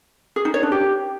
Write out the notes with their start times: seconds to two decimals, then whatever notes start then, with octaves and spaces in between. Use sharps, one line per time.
0.36 G#4
0.45 D#4
0.54 C#5
0.63 D4
0.72 G4